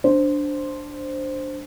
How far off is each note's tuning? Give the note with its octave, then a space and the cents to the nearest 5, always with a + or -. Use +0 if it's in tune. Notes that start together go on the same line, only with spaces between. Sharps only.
D4 +0 C5 +0